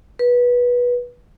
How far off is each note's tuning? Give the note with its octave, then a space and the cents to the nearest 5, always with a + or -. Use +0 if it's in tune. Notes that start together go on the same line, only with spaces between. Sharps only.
B4 -20